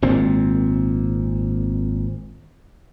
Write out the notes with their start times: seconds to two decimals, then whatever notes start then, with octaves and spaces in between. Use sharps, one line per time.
0.02 G#1 A#2 C4